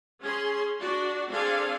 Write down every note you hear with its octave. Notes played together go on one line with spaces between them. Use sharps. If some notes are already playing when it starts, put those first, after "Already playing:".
C#4 G#4 C6
D4 F#4 D5
C4 D4 G#4 A4 F5 G#5